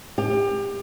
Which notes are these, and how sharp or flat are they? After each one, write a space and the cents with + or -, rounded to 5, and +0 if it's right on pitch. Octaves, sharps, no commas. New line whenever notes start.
G4 +30